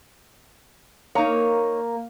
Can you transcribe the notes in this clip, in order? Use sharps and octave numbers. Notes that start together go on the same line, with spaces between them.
A#3 D#4 C#5